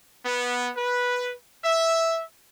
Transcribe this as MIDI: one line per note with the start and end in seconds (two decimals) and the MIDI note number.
0.25 0.71 59
0.77 1.33 71
1.64 2.22 76